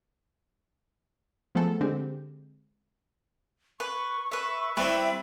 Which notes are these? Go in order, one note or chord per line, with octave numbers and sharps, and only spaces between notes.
F3 A3 B3 G#4 A4
D3 G#3 C4 G4
B4 C#6
B4 E5
G3 C4 E4 B4 E5